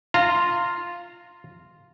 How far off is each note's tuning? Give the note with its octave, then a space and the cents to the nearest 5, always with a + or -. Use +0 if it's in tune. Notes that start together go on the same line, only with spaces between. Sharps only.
F4 +0 A#5 -25